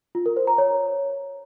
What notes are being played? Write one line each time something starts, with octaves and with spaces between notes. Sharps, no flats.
F4
A#4
C5
A#5
C#5